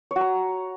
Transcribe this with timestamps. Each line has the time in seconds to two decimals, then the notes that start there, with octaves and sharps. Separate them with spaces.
0.11 C#5
0.16 F#4
0.21 A#5